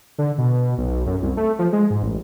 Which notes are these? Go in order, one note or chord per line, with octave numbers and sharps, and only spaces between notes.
D3
B2
B1
F#2
C2
A3
F3
G#3
G#2
A1